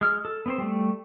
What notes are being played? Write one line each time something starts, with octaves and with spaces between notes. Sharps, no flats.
G#3 F6
A4
B3 C4 C5
G3 A3